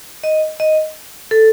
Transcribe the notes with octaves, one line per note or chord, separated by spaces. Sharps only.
D#5
D#5
A4